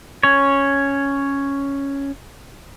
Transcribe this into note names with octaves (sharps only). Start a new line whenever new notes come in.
C#4 C#5